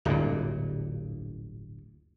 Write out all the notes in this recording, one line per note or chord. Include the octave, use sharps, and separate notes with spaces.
D1 G1 G2 A#2